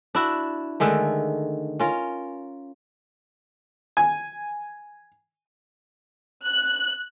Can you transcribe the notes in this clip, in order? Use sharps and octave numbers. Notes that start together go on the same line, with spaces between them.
D4 E4 F#4
D3 D#3 G#3 A3
C#4 F4 A#4
G#5
F#6